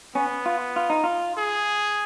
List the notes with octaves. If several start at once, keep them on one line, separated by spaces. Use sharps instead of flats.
B3 C#4
F4
F4
D#4
F4
G#4